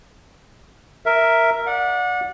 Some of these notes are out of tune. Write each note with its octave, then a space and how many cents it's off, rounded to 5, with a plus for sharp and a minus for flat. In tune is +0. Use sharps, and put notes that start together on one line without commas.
A#4 +0 E5 +0
D5 -5 F#5 -30